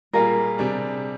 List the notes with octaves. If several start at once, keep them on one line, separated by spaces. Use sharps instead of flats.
A#2 G3 A#3 F4 G#4 A#4
C3 G3 D4 G#4